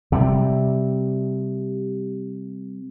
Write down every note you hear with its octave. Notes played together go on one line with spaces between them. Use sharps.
C3 G3